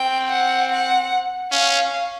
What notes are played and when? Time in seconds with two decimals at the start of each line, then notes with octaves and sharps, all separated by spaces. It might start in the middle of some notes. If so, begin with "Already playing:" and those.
Already playing: C4 G5
0.32 F#5
0.72 F#5
1.51 C#4 F5